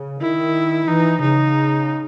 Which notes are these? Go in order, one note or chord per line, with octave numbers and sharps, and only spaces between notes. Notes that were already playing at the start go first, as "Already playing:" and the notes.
Already playing: C#3
D#3 E4
E3 D#4
C#3 D#4